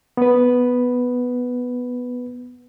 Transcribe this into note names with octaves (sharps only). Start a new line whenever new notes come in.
B3 B4